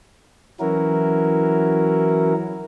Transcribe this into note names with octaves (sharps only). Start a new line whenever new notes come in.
E3 F#3 C#4 E4 F#4 A#4